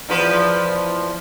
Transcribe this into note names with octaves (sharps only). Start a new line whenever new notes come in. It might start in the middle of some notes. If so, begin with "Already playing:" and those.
E2 F3 B4